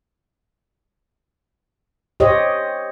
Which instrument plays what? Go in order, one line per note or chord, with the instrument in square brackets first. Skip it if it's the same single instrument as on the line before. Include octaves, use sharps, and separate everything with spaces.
[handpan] G4 C5 C#5 D#5